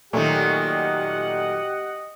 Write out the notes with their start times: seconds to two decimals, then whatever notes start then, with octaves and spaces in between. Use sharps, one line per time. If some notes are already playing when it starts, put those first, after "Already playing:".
0.13 A#2 D#3 F#3 A3 G4 D#5 F#5